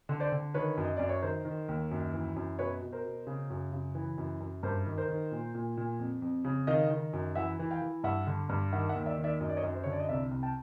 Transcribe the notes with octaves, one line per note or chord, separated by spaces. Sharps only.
D3
C5 D5
D3
D#3 B4 C#5
F#2
D#5
F#2 D5
C#5
D#3 A#4 C5
D#3
D#2
F#2
E3
F#2
B2 B4 C#5
B2
A#4 C5
B2
C#3
F#2
C#3
E3
F#2
F#2
G2 A#4 C5
D#3
A#4 C5
D#3
A#2
A#2
A#2
F2
F2
C#3
D#3 D#5 F5
D#3
F#2
E3 E5 F#5
E3
F5 G5
E3
G2 E5 F#5
D3
G2
D#3 E5 F#5
E5 F#5
D#2
D5 E5
D#3
D5 E5
F#2 D#5
D5
C#5 D#5
F#2
C5
D3 C#5
D5
D#5
C2 D5 E5
C2
G5 A5